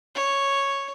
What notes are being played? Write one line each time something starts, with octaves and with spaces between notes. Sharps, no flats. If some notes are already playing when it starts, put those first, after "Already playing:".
C#5